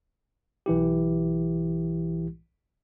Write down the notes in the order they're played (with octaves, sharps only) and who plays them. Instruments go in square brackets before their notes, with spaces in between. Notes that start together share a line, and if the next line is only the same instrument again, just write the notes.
[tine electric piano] B1 E3 E4 G4